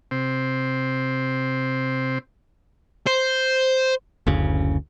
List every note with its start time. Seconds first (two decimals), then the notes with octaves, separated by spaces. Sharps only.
0.11 C3 C4
3.06 C5
4.27 F#1 D2 C#3